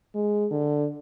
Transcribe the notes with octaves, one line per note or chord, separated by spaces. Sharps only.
G#3
D3